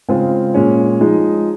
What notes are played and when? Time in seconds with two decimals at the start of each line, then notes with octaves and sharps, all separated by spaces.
0.08 C#3 G#3 C4 F4
0.54 A#2 G#3 C#4
1.01 F3 G#3 D#4